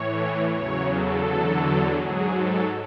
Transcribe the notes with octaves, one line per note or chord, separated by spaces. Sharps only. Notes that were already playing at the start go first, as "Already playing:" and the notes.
Already playing: A2 E3 C#5
E2 C#3 F#3 C#5
A4
E2 D3 F#3
G#2 F#3 G#4
A4